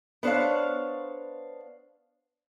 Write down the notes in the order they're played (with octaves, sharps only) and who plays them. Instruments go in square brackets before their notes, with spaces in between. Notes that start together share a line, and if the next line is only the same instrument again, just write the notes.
[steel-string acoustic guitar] B3 D4 C5 C#5 F5